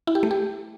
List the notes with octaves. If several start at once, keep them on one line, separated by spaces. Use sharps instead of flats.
E4
G4
A3
G4